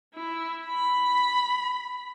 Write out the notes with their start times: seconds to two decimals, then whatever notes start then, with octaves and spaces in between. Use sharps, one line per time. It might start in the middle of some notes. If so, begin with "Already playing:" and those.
0.14 E4
0.66 B5